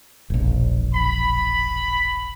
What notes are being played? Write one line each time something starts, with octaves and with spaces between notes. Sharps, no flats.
E1 A#1
B5